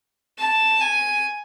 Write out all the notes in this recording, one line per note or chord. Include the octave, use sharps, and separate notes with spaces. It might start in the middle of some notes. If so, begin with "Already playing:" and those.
A5
G#5